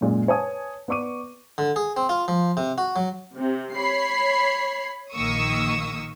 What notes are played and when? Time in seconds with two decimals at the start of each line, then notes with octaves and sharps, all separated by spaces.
0.01 F#2 A#2 G#3
0.28 B4 C#5 G#5 A5 D#6
0.88 B3 D5 C#6 D6 D#7
1.58 D3
1.76 G#4
1.97 C4
2.09 F4
2.28 F3
2.57 C3
2.78 F#4
2.96 F#3
3.36 C3
3.75 C#5 B5 C7
5.13 A#1 D#3 A#3 C#6 D#6 E6